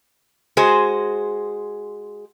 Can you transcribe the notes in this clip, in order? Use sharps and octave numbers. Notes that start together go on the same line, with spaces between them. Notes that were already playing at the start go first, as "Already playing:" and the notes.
G#3 F#4 G#4 C5